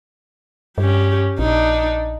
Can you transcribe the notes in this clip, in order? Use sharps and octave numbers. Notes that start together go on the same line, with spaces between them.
G2 C#4 G4
A#1 D4 D#4